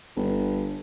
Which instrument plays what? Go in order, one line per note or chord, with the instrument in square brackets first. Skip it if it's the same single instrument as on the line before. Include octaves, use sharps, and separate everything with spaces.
[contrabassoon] G1